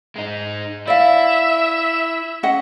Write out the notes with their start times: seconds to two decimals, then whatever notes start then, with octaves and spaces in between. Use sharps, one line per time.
0.16 G#3 D#4
0.88 E4 D5 E5 F5
2.43 C#4 D#5 F#5